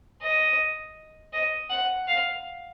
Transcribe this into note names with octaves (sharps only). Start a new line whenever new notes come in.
D#5
D#5
F#5
F5